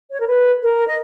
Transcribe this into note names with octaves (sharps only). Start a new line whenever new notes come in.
C#5
A#4
B4
A#4
D#5